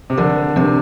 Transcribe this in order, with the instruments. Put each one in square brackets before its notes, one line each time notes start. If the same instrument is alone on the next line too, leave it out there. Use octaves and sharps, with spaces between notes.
[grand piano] C3
[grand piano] D3 [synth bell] F3 D4 A#4
[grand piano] C3 [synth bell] F3 D4 A#4